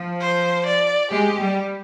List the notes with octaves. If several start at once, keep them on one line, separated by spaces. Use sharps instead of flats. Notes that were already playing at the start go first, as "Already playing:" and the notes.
Already playing: F3
C5
D5
G#3 G4
G3